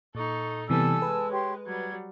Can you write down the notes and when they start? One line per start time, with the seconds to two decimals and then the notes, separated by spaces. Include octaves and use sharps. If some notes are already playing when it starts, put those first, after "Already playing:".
0.15 A#2 D#4 A4 C#6
0.70 C3 E3 G3 B3 A4 G#5 A5 E6
1.02 G#3 B4
1.31 G4 C#5 C6
1.66 F#3 G3 G#6